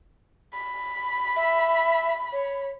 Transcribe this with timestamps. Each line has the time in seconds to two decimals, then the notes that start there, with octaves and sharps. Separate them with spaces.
0.53 B5
1.36 E5
2.32 C#5